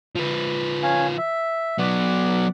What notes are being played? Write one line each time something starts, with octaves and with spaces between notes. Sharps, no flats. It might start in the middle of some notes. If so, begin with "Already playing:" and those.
F3 B4
C#4 F5 G#5
E5
F#3 B3 D5 F#5